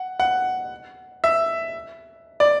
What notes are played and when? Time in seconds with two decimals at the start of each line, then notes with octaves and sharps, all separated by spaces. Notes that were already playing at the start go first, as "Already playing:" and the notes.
Already playing: F#5
0.20 F#5
1.24 E5
2.40 D5